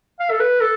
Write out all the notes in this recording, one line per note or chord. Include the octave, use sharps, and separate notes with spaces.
F5
A4
B4
A4